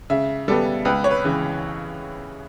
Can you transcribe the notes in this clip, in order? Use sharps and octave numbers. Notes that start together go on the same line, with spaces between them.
C#3 E5
G3 B3 A4
C#2 B4
C#5
B4
C#3 E3